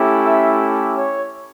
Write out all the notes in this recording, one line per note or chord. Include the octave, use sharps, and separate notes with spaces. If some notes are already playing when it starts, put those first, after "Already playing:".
Already playing: A3 C#4 E4 G4
E5
C#5